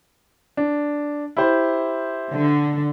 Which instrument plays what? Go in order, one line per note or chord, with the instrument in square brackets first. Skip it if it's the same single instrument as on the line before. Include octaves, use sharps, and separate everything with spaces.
[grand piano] D4
E4 G4 C5
[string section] D3